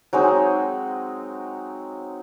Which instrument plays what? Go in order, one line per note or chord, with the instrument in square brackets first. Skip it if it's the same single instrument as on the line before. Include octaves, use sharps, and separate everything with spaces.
[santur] F#3 G#3 C4 D#4